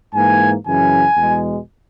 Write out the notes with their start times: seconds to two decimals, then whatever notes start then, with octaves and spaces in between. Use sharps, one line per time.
0.14 G#2 E3 A#3 G#5
0.65 F#2 C#3 E3 G#5
1.17 E2 B2 G#3